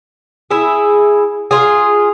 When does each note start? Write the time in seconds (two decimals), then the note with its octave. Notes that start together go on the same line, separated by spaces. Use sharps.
0.51 E4 G#4
1.51 F4 G#4